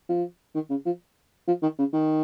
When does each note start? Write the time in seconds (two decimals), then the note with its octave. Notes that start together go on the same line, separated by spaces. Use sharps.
0.09 F3
0.55 D#3
0.70 C#3
0.86 F3
1.47 F3
1.62 D#3
1.79 C#3
1.93 D#3